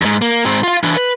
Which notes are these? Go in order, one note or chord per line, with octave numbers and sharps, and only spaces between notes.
E2 G#2
A#3
G#2 C4
F4 F5
E3 D4
B4